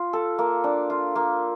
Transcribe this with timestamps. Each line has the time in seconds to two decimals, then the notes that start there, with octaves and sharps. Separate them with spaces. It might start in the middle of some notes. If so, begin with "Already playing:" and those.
Already playing: F4
0.13 A4
0.38 A#3
0.64 D4
0.90 F4
1.15 A#3